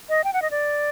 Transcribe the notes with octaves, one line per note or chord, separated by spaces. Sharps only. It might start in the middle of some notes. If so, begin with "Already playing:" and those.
D#5
G5
F#5
D#5
D5